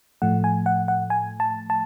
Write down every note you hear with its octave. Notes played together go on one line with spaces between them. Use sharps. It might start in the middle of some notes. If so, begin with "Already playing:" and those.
A2 F3 A3 F#5
G#5
F#5
F#5
G#5
A5
A5